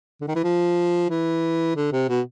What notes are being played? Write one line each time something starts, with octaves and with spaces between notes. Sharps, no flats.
D3
D#3
E3
F3
E3
D3
C3
B2